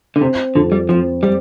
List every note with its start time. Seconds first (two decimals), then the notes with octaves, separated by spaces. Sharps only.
0.16 D3
0.21 C3 C4
0.55 F2 D3
0.72 G3
0.89 F3 C4
1.23 G3 C4